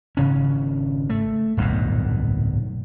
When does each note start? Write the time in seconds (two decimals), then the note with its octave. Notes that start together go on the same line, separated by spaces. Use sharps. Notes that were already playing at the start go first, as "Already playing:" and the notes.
0.17 G#1 C#3 C#4
1.10 A3
1.57 D1 B1 G2 A#2